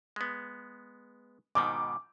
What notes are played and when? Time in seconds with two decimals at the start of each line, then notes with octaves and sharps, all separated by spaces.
0.16 G#3 B3
1.55 G#2 B2 D#3 D6